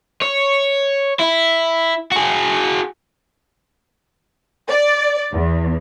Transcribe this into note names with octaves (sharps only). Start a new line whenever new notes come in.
C#5
E4
F#4 G#4
D5
E2